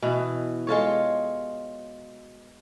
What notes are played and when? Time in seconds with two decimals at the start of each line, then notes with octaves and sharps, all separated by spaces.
0.02 B2 E3
0.67 G#3 F4 A4 C#5